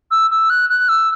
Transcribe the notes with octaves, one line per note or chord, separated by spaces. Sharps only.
E6
E6
F#6
F#6
E6